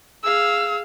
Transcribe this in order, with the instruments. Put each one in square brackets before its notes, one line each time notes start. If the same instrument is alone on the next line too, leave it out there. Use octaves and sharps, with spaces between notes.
[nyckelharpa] G#4 F5 [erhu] E6